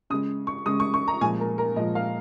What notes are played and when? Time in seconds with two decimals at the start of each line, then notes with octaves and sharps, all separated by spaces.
0.10 C#3 D#6
0.14 G#3
0.47 C#6
0.66 C#3 G#3 D#6
0.80 C#6
0.94 C#6
1.08 A#5
1.21 A#2 F3 G#3 G#5
1.40 A#4
1.58 A#4
1.76 A#2 F3 G#3 D#5
1.95 F5